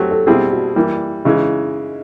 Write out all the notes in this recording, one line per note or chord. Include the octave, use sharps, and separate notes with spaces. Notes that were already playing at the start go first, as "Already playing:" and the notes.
Already playing: F#3 A3 C4 F#4 G4
A4
B2 G3 C4 E4 G4 G#4
F#4
E3 G3 A#3
C#3 E3 G#3 D#4